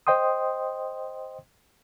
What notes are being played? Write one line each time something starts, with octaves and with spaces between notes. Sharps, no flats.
C5 D#5 G5 C6 D#6